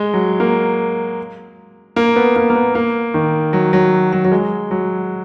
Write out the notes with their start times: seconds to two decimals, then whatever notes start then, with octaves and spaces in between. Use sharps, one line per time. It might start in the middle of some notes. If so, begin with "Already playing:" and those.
Already playing: G#3
0.14 F#3
0.40 A#3
1.96 A#3
2.16 B3
2.36 A#3
2.50 A#3
2.55 B3
2.75 A#3
3.14 D#3
3.53 F#3
3.73 F#3
4.13 F#3
4.25 F#3
4.32 G#3
4.71 F#3